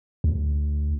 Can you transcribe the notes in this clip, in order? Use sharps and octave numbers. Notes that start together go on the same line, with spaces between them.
D2